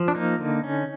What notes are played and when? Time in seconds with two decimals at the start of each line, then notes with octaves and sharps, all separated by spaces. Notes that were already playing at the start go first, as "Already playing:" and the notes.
Already playing: F3
0.08 D4
0.15 A#3 D#4
0.38 D3
0.64 C#4